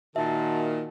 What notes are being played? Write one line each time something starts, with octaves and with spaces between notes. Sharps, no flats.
A#2 D#3 F#4 E5 A5